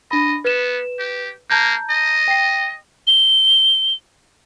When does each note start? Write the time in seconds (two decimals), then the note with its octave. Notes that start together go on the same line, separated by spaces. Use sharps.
0.11 D4 D#5 B5
0.45 B3 B4 E7
0.99 G4
1.50 A#3 A5 A#5 G6
1.90 D#5
2.28 G5 C7
3.07 G7